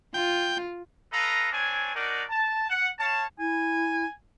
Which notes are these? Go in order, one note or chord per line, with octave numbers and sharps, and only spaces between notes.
F4 G5
A4 B4 D#5 F5 A#5
C4 D4 C#5 G#5
D4 D#4 F#4 A#4 D5
A5
F#5
C#5 F5 A5
E4 G#5